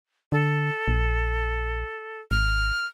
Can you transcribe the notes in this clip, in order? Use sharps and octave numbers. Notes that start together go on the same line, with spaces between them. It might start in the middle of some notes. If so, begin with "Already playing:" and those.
D3 A4
A#1
G#1 F6